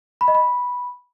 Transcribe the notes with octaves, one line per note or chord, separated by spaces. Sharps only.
B5
D#5
B5